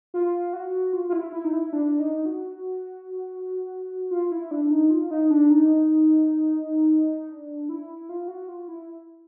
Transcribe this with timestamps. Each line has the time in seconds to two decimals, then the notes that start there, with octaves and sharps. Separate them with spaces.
0.14 F4
0.53 F#4
0.93 F4
1.09 F4
1.13 E4
1.32 E4
1.44 D#4
1.53 E4
1.73 D4
2.00 D#4
2.26 F#4
4.11 F4
4.32 E4
4.51 D4
4.71 D#4
4.90 F4
5.11 D#4
5.30 D4
5.50 D#4
7.29 D4
7.69 E4
8.09 F4
8.28 F#4
8.49 F4
8.68 E4